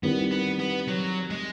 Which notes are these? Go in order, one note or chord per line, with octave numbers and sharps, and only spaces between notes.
D#3 G3 B3 C4 E4 G4
B3
B3
F#3
G#3